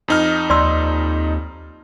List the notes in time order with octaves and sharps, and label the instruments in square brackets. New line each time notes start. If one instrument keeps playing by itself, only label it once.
[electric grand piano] F2 D#4 F6
[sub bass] D#2 [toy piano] D5 C6 E6